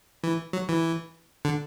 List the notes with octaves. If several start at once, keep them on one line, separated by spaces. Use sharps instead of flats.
E3
F#3
E3
D3